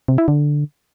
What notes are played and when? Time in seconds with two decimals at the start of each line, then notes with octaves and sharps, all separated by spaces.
0.08 C3
0.18 E4
0.28 D3